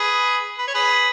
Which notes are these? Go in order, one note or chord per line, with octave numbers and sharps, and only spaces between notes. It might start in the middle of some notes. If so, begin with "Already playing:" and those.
Already playing: G#4 B4
B4
C#5
G#4 B4